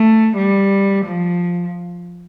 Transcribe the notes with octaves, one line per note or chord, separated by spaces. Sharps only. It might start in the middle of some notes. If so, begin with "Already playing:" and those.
Already playing: A3
G3
F3